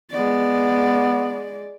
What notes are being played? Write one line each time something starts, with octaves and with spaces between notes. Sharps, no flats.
G#3 B3 D5